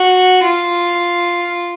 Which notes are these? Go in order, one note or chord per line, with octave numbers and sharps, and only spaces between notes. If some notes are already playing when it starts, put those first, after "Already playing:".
Already playing: F#4
F4